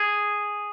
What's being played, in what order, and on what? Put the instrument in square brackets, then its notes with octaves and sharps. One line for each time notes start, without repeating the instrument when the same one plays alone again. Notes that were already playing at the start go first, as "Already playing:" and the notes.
Already playing: [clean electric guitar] G#4